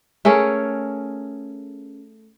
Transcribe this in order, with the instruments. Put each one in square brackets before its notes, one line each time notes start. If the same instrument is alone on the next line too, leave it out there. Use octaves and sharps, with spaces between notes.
[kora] A3 C#4 G#4 A#4